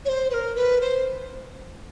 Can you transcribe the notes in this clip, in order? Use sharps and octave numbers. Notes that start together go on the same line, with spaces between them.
C#5
C5
B4
A#4
B4
C5